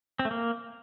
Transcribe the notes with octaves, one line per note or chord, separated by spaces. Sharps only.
C4
A3
A#3